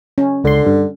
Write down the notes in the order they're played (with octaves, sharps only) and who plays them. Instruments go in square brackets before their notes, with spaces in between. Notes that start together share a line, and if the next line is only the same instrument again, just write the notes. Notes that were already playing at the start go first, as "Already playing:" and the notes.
[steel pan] C#4
[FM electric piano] C#2 C6 [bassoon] D3
[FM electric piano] G2